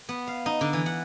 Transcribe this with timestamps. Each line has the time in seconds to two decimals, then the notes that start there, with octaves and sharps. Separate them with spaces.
0.09 B3
0.27 F5
0.46 D#4
0.61 D3
0.73 E3
0.86 F#5